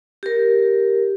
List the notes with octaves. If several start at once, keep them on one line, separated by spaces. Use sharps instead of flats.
G4 A#4